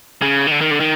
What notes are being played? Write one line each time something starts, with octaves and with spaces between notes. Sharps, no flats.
C#3
D#3
D3
D#3
D3
D#3